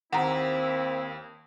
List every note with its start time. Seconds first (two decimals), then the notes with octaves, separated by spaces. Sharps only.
0.13 D#2 A#3 C4 E4 F#5 A#5